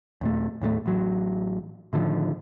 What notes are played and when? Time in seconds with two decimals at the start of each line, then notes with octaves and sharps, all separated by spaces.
0.21 D#2 A#2 A3
0.62 D#2 A2 G3 A3
0.86 A1 F#3
1.93 A2 D3 D#3 F3